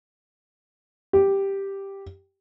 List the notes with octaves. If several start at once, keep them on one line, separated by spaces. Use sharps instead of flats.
G4